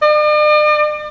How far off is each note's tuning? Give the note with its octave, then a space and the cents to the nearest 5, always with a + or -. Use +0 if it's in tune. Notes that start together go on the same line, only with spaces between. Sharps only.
D5 +45